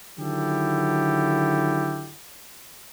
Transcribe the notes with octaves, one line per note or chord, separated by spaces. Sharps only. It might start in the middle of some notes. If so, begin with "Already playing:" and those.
D3 D#3 F#3 E4 G4 A4